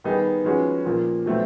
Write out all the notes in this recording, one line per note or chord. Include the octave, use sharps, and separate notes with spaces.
D#3 G3 B3 D#4 G#4
F3 G#3 C#4 F#4 B4
A#2 F3 A#3
B2 F#3 A3 C4